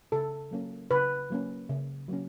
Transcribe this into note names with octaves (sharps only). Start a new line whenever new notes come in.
C#3 A4
F#3 A#3 C#4
C#3 B4
F#3 A#3 C#4
C#3
F#3 A#3 C#4